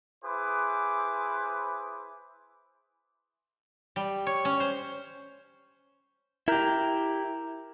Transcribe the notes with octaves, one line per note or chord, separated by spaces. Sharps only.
E4 G#4 B4 C5 D6
G3
C#5
C#4
C5
E4 G4 A#4 A#5 G6